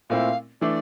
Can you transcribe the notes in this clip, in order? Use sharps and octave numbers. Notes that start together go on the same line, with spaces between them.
A#2 A3 C4 E4 F5
E3 A3 D4 D5